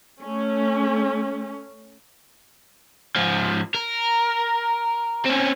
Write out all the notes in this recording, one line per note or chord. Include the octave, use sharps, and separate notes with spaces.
A3 C#4
G#2 F3
A#4
C4 C#4